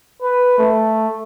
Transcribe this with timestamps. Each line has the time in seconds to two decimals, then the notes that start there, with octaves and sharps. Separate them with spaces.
0.22 B4
0.58 A3